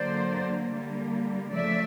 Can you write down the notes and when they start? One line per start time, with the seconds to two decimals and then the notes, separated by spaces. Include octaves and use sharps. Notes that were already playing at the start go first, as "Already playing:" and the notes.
Already playing: D3 F#3 A#3 C5 D5
0.71 D3 G3 A#3
1.53 C#3 F3 A3 D5 E5